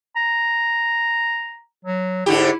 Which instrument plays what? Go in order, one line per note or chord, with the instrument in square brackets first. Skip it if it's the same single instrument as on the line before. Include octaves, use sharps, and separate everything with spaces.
[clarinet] A#5
F#3
[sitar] G#2 D3 G4 [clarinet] E4